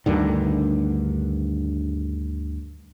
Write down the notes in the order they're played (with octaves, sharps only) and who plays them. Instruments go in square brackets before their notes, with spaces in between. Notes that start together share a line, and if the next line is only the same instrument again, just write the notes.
[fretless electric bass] D2 G2 D3 D#3